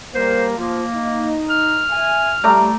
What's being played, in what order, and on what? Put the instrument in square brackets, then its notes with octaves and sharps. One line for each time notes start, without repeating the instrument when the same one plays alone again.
[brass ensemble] G3 A#3 [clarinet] C5
[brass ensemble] F3 [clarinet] A#3
[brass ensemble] D#4
[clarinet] F6
[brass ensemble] E5 G#5
[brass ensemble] G3 [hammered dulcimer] A3 A#5 D6